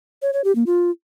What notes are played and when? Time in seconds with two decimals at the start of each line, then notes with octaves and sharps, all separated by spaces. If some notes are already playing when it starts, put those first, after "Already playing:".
0.22 C#5
0.33 C#5
0.44 G4
0.55 A#3
0.66 F4